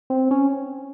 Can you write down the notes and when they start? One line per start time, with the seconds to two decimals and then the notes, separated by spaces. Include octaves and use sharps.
0.10 C4
0.31 C#4